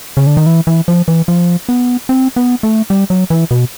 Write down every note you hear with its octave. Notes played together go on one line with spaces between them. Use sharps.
C#3
D3
D#3
E3
E3
F3
E3
F3
B3
C4
B3
A3
G3
F#3
E3
B2